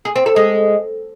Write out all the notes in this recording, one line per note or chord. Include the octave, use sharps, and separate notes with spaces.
G#4
C4
A4
G#3